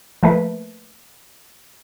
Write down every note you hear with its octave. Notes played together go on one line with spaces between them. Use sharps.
F3 A3 A#3 B4